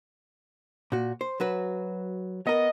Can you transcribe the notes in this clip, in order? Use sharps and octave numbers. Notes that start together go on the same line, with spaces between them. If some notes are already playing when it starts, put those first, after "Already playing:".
A#2 F#4
C5
F#3 F#4 B4
B3 A#4 D#5